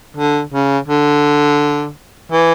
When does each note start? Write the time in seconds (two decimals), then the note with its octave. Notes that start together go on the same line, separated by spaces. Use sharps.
0.17 D3
0.53 C#3
0.88 D3
2.32 E3